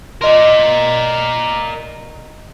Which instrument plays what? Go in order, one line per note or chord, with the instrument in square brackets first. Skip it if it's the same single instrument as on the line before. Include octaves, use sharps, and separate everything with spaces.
[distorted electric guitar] A#4 D5 [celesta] D#5 C6